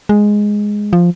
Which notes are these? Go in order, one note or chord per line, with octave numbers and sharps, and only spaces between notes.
G#3
F3